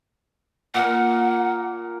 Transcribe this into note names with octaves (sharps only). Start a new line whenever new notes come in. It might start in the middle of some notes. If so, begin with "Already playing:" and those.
A#2 A#4 F#5